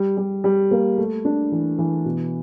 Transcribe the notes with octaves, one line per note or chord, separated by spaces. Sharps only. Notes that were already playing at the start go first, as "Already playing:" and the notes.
Already playing: G3
G3
G3
A#3
A3
D4
E3
E3
B2